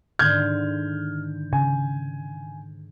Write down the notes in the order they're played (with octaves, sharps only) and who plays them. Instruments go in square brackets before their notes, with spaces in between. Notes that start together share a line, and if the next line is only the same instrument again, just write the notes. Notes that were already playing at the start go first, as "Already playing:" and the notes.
[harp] G#2 D3 D#3 [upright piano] F6 G6 G#6
[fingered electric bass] C#3 [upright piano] G#5